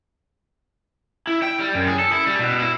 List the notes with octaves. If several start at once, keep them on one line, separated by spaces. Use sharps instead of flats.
E4
G5
G3
F#2
G#4
A4
E4
G3
B2
E4